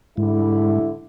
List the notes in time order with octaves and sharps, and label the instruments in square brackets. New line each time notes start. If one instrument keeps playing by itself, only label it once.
[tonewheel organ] G#2 [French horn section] D3 G3 E4